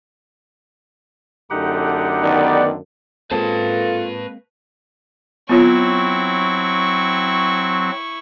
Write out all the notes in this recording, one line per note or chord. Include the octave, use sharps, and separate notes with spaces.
F#2 D3 A3 D#4 G4 F#5
D#3 B3 D5
G#3 A#3 C4 F4 A4 B4 A5
F#3 B3 C4 E4 F4 C#5 C#6